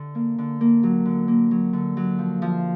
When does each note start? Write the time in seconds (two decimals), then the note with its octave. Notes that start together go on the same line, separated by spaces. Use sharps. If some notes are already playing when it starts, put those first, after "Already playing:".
Already playing: D3
0.15 A#3
0.38 D3
0.61 A#3
0.83 F#3
1.06 D3
1.28 A#3
1.51 F#3
1.73 D3
1.97 F#3
2.19 F3
2.42 F3